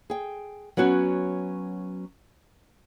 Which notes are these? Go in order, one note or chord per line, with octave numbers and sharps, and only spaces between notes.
G#4 G5
F#3 B3 C#4 F#4